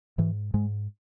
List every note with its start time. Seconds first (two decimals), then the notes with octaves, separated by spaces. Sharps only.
0.18 G#2 E3
0.54 G#2 G#3